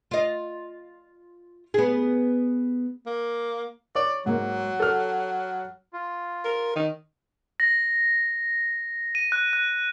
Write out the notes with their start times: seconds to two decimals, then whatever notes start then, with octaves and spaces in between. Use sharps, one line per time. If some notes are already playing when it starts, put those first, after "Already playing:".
0.11 F4 D#5
1.74 B3 G#4
3.07 A#3
3.95 C#5 D5
4.26 G#2 F#3 A#3
4.80 A4 F6
5.93 F4
6.45 A#4
6.76 D#3
7.60 A#6
9.15 D#7
9.32 F#6
9.53 F#6